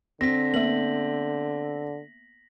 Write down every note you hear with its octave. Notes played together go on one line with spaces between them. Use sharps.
D3 C4 A#6 B6
A#3 B3 E5 F#7